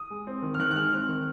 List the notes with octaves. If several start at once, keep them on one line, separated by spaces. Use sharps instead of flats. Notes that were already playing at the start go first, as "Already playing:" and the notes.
Already playing: D#6
G#3
C4
D#3
F6
D#3 F#6
F#6
G#3 F6
C4 F6
D#3